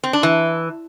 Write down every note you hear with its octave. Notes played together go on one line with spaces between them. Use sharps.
C4
D4
E3